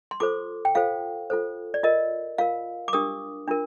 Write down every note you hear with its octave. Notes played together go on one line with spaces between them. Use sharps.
C6
F4 A4 C5 D6
G5
F4 A4 C5 F5
F4 A4 C5
D5
F4 A#4 D#5
F4 A#4 F5
D6
D4 G4 A#4 D#6
D4 F4 A#4